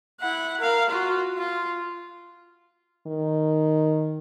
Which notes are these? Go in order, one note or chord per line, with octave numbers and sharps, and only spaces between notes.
E4 F#5
A#4 F5
F4 F#4
F4
D#3